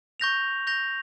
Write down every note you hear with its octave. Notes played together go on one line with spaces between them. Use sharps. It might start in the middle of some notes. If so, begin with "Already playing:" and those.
C#6 G6 A#6 F7
C#6 G6 A#6 F7